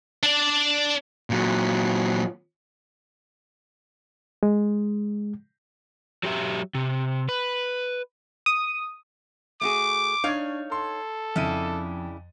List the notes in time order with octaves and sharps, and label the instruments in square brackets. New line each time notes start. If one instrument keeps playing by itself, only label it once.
[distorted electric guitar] D4 D5
[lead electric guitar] A#2 F#3
[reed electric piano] G#3
[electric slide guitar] F#3 G4 E5
C3
B4
[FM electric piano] D#6
[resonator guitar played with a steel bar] A3 F#4 G#4 [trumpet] D6
[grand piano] D4 G#6 [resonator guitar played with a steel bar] D#4 C#5 F5
[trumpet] A4 [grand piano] C6
[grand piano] F2 D#7 [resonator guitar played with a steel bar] C#3 D4 E4